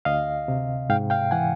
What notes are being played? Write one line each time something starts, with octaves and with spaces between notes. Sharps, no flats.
D2 D#5 F5
C3
G#2 F5 G5
F5 G5
E3 F#5 G#5